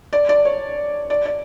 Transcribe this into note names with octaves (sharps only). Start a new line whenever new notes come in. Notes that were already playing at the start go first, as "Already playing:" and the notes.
D5
D5
C#5
D5
D5